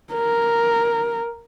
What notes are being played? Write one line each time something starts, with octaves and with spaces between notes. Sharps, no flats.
A#4